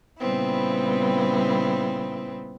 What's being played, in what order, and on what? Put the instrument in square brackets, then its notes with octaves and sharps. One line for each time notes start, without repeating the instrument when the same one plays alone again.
[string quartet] A#2 C#3 G3 B3 C4 E4